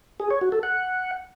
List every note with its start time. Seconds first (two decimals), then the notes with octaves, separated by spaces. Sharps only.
0.20 G#4
0.31 C#5
0.41 F#4
0.52 A4
0.63 F#5